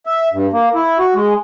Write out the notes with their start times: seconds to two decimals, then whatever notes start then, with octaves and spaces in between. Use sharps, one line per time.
0.06 E5
0.33 G2
0.53 A#3
0.75 E4
0.99 F#4
1.15 G#3